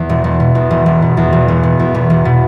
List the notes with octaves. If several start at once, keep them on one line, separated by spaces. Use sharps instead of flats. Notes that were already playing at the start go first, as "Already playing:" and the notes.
Already playing: E2
E1
E1
B2
E2
E1
E1
B2
E2
E1
E1
B2
E2
E1
E1
B2